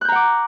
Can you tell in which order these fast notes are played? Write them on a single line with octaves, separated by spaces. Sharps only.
F#6 G6 A#5 F#5 D6